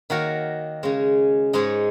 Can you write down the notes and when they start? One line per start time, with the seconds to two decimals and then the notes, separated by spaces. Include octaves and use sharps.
0.10 D#3 A#3 F#4 A#4 C#5
0.83 C#3 G#3 C#4
1.53 G#2 G#3 D#4 G#4 C#5